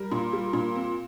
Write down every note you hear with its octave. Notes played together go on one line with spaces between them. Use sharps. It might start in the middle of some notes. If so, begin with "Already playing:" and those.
Already playing: G3 A#4
A#2
G3
A#2
C4